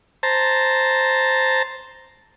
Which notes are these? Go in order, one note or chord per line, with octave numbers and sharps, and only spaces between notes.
C5 A5 A#5